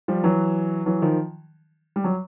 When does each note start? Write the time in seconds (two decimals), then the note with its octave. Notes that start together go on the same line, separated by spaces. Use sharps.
0.08 F3 G3
0.24 E3 F#3
0.86 E3 F#3
1.02 D#3 F3
1.96 G3
2.04 F#3